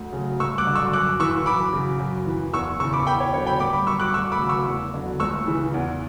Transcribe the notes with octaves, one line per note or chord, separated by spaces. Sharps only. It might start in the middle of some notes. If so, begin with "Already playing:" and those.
Already playing: D2
C#3 F#3
G2 C#6 E6
D6 F#6
D3 F#3
C#6 E6
F#2 D6 F#6
E3 C#6 E6
F#2 B5 D6
C#3 F#3
F#2
E3
E2 C#6 E6
C#3 E3 C#6 E6
B5 D6
E2 G5 B5
C#5
D3 F#3 C#5
G5 B5
G2 B5 D6
B5 D6
F#3 C#6 E6
D6 F#6
D2 C#6 E6
B5 D6
C#3 F#3
C#6 E6
E2
D3 F#3
C#2 C#6 E6
C#3 E3
E2